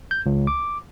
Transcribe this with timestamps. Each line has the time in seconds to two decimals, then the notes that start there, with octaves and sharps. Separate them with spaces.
0.11 G6
0.26 C#2
0.47 D6